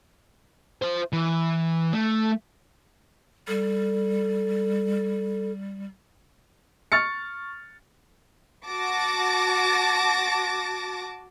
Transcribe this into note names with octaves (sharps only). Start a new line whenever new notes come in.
F4 C5
E3
A3
G3 A4
C#6 F6 A6 C#7
F#4 A5 D6 A6 A#6